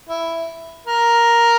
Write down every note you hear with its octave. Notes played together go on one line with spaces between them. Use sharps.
E4
A#4